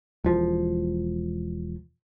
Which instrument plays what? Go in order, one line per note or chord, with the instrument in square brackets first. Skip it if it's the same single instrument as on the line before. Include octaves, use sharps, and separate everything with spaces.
[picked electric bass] E1 F3